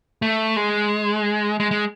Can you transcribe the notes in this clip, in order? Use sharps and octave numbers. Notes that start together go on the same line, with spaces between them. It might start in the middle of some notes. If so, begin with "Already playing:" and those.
A3
G#3
G#3
G#3